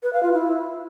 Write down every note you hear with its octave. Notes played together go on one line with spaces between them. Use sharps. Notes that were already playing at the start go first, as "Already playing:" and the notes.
B4
F5
F4
E4